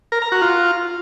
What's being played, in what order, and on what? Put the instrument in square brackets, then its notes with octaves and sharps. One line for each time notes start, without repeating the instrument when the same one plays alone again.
[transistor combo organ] A#4
A#5
F#4
F4